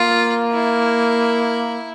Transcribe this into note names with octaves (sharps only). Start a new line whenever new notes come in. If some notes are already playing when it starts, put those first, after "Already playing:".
Already playing: A#3 F4
E4